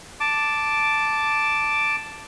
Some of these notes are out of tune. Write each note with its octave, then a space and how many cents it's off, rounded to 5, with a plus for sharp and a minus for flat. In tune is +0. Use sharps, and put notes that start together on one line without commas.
A5 +0 D6 +0